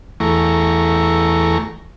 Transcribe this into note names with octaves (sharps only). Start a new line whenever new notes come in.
E2 E3 A3 A#5 C#6